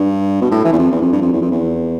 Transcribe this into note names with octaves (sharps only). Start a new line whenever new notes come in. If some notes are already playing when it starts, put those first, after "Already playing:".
Already playing: G2
B2
A2
E3
E2
F2
E2
F2
G2
F2
E2
F2
E2